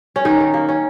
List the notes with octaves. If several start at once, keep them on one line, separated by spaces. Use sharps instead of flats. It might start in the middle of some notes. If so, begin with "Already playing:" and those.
C#4
D#3 D#4
D#3
A#3
C#4